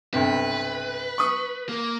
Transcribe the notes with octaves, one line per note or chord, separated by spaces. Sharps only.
B1 G2 C3 B4
C#6 D#6
A#3